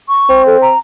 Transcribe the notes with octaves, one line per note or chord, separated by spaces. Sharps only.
C#6
C4
A4
A#5